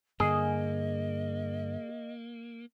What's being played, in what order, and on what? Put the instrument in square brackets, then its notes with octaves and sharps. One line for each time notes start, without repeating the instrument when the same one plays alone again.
[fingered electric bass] G2 D3 [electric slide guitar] A#3 [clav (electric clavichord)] G#4 [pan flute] D#5